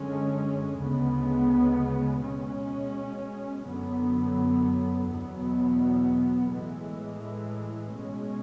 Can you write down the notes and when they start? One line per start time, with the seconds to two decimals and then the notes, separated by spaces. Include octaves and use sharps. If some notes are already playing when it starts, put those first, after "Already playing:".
Already playing: F#2 D3 G#3 C#4
0.79 D2 C#3 G#3 B3
2.21 B2 G#3 C#4
3.64 F#2 D3 F#3 B3
5.07 E2 B2 F#3 B3
6.50 A2 E3 G#3
7.92 B2 G#3 C#4